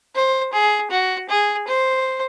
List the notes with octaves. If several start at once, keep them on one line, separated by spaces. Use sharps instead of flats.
C5
G#4
F#4
G#4
C5